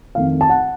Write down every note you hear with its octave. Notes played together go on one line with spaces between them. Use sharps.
F2 D#3 A3 F5
A5
F#5